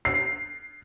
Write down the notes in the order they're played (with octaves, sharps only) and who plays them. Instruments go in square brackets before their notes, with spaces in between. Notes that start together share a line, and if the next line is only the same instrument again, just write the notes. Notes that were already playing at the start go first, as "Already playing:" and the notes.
[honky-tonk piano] C7